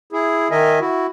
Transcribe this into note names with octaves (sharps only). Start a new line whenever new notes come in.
E4 G#4
D#3 A#4 D#5 E5 G#5
E4 F#4